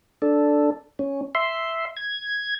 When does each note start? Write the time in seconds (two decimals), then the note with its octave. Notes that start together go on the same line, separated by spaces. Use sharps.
0.22 D4 A4
0.99 C#4
1.35 E5 C6
1.96 G#6